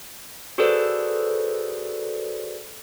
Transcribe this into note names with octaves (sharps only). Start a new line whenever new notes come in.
F#4 G#4 A4 B4 C5 D5